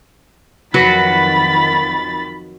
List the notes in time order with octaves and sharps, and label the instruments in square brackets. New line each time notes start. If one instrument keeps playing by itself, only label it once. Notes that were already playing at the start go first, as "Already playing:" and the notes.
[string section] F2 D#3 A6 [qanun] F#3 F#4 B4 [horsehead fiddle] B5